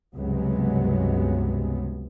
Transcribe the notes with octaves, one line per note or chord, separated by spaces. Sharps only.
C#2 G2 C3 F#3 G#3 B3